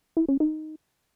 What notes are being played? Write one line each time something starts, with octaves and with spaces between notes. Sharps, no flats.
E4
C#4
D#4